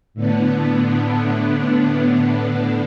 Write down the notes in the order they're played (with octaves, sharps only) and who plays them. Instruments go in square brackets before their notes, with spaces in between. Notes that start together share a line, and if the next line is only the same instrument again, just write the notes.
[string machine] A2 D3 B3 D4